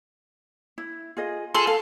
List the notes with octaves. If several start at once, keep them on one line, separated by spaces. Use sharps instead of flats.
E4
F4 G#4 D#5
F4 G#4 A4 C6
A4 F5